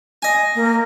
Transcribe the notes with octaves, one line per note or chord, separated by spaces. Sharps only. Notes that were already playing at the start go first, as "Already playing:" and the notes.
D#5 G#5
A#3